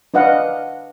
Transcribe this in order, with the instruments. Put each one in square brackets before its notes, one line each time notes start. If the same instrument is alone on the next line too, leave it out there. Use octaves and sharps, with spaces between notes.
[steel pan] D4 B4 D#5 F5 F#5